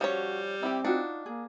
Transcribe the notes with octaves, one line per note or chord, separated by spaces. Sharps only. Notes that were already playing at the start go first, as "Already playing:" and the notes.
F3 G3 C#4 F#4 C#5
C4 E4 G4
D4 D#4 F4 F#4
A#3 G#4